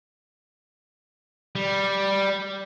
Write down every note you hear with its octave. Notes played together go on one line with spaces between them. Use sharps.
G3